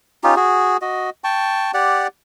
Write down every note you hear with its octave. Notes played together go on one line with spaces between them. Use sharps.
C#4 D#4 F4 G4
F#4 G#4
F#4 D#5
G5 A5 C#6
G4 D5 F#5